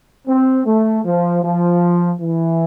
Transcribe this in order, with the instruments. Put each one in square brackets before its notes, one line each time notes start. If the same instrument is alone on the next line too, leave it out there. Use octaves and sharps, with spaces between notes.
[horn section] C4
A3
F3
F3
E3